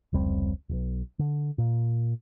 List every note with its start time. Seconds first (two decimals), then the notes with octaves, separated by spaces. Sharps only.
0.13 F1 C#2 G3 C4
0.69 D1 B1
1.19 D3
1.58 A#2